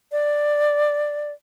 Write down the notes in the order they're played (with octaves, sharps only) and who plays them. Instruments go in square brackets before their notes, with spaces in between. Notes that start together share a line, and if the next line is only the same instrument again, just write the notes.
[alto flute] D5